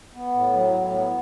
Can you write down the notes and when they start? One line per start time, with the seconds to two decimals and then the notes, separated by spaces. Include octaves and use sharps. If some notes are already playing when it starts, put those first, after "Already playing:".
0.14 B3
0.33 A2
0.53 F#3
0.73 A2
0.92 B3